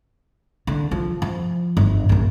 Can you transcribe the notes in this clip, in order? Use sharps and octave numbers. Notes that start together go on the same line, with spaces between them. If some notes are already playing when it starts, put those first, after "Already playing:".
D3
F3
F3
G1
A#1 F#2